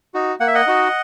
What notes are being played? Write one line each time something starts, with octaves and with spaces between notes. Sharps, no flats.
D#4 F#4
A#3 F#5
E5
D#5 F#5
D#4 F#4